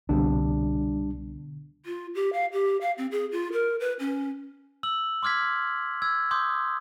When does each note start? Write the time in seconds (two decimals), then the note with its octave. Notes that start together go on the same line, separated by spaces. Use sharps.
0.09 C2 B2 D3 G3 C4 D4
1.86 F4
2.15 G4
2.33 F5
2.53 G4
2.81 F5
2.98 C4
3.12 G#4
3.32 F4
3.52 A#4
3.80 B4
4.00 C#4
4.83 E6 F#7
5.23 C6 D6 F6 G#6 B6
6.02 E6 G#6
6.31 C6 D6 D#6 G6